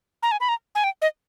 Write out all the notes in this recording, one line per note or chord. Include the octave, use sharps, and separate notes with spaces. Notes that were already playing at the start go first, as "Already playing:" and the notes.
A#5
G#5
B5
A#5
G#5
G5
D#5